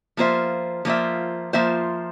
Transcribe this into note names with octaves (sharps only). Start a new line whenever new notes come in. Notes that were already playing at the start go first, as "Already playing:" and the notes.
F3 A#3 F4 C5 E5
F3 A#3 F4 C5 E5
F3 A#3 F4 C5 E5